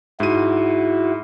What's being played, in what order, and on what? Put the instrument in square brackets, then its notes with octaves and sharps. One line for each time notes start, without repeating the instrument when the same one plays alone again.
[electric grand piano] G#2 D#7 [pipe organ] E4 F#4